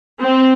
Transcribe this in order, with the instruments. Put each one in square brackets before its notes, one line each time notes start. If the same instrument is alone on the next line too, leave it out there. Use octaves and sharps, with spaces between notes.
[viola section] C4